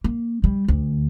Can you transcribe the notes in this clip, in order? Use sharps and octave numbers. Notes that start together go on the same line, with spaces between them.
A#3
G3
D2